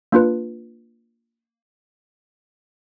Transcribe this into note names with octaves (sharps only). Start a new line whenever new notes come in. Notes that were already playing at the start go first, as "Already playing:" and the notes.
A#3 D4 F4 B4